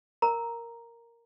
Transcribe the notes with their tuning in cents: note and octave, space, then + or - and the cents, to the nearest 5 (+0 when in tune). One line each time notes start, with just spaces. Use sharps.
A#4 +0 A#5 +0